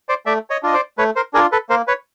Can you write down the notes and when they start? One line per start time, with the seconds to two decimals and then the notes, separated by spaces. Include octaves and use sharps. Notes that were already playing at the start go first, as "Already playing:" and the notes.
0.09 C5 D5
0.26 A3 D5 E5
0.50 C#5 D#5
0.63 D4 F4 D#5
0.74 C5 D5
0.98 A3 B4 C#5
1.16 A#4 C5
1.33 D4 F4 G#4 A#4
1.52 A4 B4
1.69 A#3 A#4 C5
1.87 B4 C#5